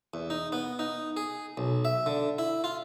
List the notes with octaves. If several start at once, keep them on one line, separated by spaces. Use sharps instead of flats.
E2
D#4
B3
D#4
G#4
B1
E5
D3
E4
F4